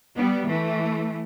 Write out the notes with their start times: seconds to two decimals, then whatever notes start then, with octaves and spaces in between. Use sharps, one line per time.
0.17 G3 B3
0.49 E3 A3